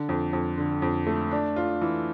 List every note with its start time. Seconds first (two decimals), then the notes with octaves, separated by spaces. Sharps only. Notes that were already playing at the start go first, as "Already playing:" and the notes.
Already playing: D3
0.09 F2
0.33 F2
0.58 D3
0.82 F2
1.07 A3
1.31 D4
1.56 F4
1.81 E3